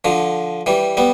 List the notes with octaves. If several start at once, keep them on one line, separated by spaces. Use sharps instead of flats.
D3 F3
E3 G3
G3 B3